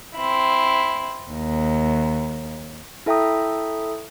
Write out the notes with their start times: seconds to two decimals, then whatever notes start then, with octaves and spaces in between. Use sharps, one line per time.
0.15 C4 E4
1.31 D#2
3.06 E4 A4 E5 G5 A#5 D#6